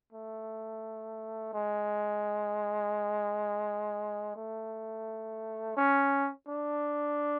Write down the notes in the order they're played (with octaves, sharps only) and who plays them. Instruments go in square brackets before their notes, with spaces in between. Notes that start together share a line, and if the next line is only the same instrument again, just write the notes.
[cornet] A3
G#3
A3
C#4
D4